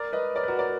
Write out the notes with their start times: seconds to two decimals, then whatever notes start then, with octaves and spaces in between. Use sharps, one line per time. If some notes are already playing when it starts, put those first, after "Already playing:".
Already playing: A#4 D5
0.13 B4 D#5
0.36 A#4 D5
0.43 B4
0.48 F#4 A#4
0.59 A#4 D5